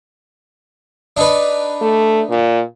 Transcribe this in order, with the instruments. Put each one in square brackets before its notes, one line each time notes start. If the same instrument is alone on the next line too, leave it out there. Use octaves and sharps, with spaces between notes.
[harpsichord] D4 D#4 B4
[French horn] A3
A#2